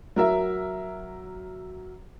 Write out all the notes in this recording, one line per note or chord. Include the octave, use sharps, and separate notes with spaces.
F#3 A#4 E5